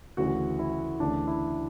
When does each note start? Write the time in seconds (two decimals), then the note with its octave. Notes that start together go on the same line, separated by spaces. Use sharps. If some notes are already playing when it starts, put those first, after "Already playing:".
0.17 D2 C#3 E3 F#4
0.59 E4
1.00 D2 C#3 E3 D4
1.27 E4